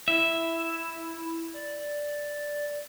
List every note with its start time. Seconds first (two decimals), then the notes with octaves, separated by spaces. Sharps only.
0.08 E4 E5
1.54 D5